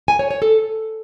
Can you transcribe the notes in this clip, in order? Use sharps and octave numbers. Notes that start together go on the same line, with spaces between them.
G#5
C#5
C#5
A4